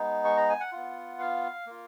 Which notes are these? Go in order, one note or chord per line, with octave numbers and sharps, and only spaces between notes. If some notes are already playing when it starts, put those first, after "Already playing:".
Already playing: G#3 B3 D#4
C#6
A#5
G#5
F#5
B3 F4
F5
A#3 F4